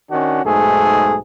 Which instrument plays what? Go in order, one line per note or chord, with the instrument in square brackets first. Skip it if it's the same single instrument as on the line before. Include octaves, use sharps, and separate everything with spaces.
[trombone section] D#3 C#4 D4 F#4
B1 G#2 A3 G#4